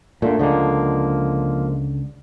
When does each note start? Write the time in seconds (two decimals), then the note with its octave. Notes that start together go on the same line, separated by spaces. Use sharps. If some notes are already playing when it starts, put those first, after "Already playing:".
0.22 A#2 D3 A3
0.39 C#2 D3 F3 G#3 A#3